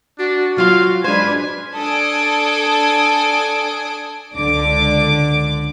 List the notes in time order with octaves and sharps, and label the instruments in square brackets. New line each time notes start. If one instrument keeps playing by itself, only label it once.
[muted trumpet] D4 [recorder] F#4
[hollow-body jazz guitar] F#3 F4 [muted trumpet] F5
[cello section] G#3 D4 B4 [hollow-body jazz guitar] C5 [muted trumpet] G#5
[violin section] D4 A4 G#5 D#6 D7
[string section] C#2 D3 D4 D6